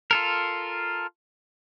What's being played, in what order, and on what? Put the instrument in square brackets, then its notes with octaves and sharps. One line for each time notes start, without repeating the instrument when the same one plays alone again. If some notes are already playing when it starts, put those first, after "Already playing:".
[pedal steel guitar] F4 A4 A#4